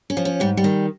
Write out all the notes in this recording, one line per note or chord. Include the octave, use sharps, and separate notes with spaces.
C#4
F3
C#4
G#2 G3
G3
D#3